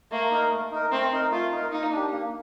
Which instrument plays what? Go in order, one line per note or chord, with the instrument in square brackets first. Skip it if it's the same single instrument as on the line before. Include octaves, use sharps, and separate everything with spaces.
[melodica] A3 [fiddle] A#3
[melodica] D#4 A#4
A3
D#4 A#4
[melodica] A3 [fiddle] C4
[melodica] D#4 A#4
[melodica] A3 [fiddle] F4
[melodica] D#4 A#4
[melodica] A#3 [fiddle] D#4
[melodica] D4 G4
A#3